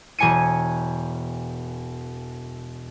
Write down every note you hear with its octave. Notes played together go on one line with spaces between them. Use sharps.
E1 C#5 G#5 C#7 D#7